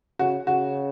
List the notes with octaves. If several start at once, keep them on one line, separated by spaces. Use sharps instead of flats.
C#3 F#4
C#3 F#4